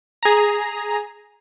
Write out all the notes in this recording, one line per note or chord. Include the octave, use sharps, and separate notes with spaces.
G#4 A#5